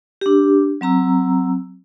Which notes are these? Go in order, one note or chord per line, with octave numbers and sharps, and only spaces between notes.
D4 G4
F#3 C4 A#5 E6